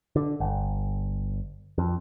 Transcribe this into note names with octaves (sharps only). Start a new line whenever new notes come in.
D3
G1
F2